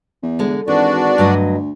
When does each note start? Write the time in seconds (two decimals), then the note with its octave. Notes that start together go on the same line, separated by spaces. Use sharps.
0.23 E2
0.39 D3 G#3
0.68 G#1 E3 D4 F#4 D5
1.18 D2 G2 F#3 D#5